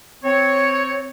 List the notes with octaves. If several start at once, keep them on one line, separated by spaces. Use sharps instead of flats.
C4 C#5